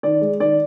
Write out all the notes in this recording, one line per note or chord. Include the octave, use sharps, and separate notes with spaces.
D#3 D5
G#3
D#3 D5